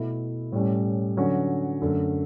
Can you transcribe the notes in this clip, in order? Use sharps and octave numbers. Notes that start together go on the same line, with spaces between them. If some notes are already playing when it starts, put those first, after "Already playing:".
Already playing: B2 A3 E4
A2 G3 C#4
D3 F#3 C#4 F#4
F#2 D3 A3